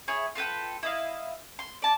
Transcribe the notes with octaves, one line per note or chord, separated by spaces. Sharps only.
E4 G#4 C#5
F4 A4 B4 G5
E4 D#5 F5
C6
D5 A5